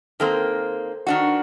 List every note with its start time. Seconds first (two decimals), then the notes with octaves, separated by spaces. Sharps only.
0.20 D#3 A#3 C4 A4 A#4 C5
1.07 D#3 D4 F#4